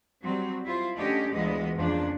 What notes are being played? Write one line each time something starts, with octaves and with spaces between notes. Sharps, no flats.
F#3 G3 C4
E4 F4 C5
D3 A3 C#4 G4 D#5
D2 A#2 E3 G#3 B3 D#5
F2 C#3 F3 A#3 D4